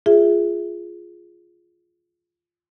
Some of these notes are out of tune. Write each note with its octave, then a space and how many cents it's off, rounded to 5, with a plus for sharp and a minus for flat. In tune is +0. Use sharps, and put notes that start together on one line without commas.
F4 -5 G#4 +0 E5 +0